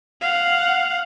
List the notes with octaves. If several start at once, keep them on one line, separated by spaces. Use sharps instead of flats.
F5 F#5